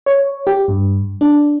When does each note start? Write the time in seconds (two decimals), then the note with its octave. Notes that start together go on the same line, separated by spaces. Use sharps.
0.06 C#5
0.47 G4
0.68 G2
1.21 D4